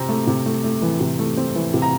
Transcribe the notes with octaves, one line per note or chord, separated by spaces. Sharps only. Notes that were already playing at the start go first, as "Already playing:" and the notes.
Already playing: C3 C4 A#5
A3
C3
A3
A3
E3
C3
A3
C4
E3
C3
A#5